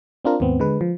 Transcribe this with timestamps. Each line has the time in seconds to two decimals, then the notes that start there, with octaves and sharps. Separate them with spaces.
0.25 C4 D4 F4 A#4
0.40 D#2 G#2 B3 C4
0.60 D3 G#3 B4
0.81 F3